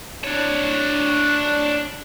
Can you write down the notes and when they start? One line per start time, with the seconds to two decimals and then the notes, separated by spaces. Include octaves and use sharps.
0.24 D4 C#5